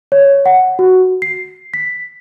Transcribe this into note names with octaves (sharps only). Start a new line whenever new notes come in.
C#5
F#5
F#4
C7
B6